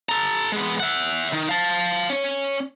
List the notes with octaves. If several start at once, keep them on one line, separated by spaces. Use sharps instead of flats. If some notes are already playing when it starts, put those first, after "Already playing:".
A4 A#5
G#3 B3
E5 F#5
D#3
F5 A5
C#4 C#5